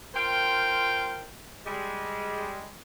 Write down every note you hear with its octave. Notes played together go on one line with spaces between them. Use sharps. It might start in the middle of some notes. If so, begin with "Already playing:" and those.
F4 A#4 C5 G5
G3 G#3